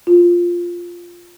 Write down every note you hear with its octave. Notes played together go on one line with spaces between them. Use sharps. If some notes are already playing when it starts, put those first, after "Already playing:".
F4